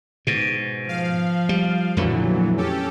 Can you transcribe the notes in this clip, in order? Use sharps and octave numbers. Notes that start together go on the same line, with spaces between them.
G#2 B2
F3 F5
G3
F2 A#2 D3 E3 F#3 A3
C#4 G4 A4